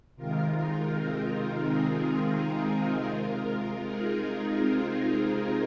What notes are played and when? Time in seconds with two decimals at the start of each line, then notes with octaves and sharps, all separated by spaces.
0.16 C3 D#3 G#3 F4 A#4
0.53 D#4
0.89 C4 F4
1.63 D#4 G#4
2.36 F4 A#4
3.09 C3 G#3
3.82 D#4 G#4
4.55 C4 F4
5.29 D#4